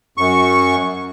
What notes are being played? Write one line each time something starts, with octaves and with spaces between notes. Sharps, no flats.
F#2 C#6